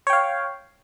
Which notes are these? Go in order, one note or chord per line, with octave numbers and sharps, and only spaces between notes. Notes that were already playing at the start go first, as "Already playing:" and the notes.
C#5 F5 G5